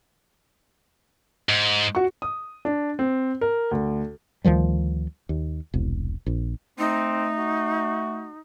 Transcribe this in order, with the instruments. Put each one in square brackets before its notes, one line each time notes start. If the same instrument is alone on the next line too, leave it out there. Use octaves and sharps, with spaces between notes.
[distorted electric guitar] G#2
[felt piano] F#4 C#6
[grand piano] D#6
D4
C4
A#4
D2
[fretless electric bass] D2 D#3 F3 G3
D#2
E1 C2
A#1
[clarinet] A3 [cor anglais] C4 [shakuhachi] D#4
[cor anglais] F#4